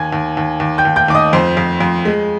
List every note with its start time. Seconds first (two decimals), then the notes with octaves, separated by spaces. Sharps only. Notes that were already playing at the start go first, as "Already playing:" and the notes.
Already playing: D#2 G#5 G#6
0.13 D#2
0.37 D#2
0.60 D#2
0.78 G5 G6
0.85 D#2
0.96 G5 G6
1.08 D#2 D6
1.15 D#5 D#6
1.33 F2 C5 C6
1.57 F2
1.80 F2
2.05 G#3